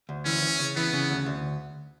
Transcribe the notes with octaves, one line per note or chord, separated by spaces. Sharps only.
D2
E3 C#4
E3
C#3
E3 B3
C#3
D2
D2